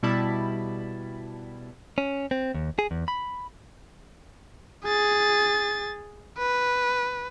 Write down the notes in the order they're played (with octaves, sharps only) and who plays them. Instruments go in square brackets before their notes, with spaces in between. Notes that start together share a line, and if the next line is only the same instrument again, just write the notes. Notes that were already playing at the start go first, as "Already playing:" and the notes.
[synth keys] B2 G3 E4 A5 B5
[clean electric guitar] C#4
C4
D#2
G#4
E2
B5
[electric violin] G#4 A6
B4